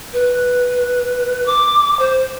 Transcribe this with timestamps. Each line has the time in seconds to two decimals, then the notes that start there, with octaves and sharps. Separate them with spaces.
0.13 B4
1.46 D6
1.99 C5